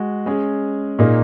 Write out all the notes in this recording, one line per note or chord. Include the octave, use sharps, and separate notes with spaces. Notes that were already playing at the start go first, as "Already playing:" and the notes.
Already playing: G#3 F#4
G#3 C#4 G#4
A#2 A#3 D#4 G#4